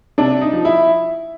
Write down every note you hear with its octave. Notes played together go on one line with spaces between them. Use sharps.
C3 D4
D#4
F3
E4